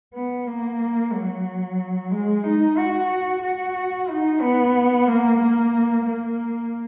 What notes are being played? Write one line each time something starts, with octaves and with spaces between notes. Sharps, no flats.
B3
A#3
F#3
G#3
D#4
F#4
F#4
D#4
B3
A#3
A#3
A#3